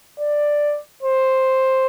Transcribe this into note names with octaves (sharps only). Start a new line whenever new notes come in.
D5
C5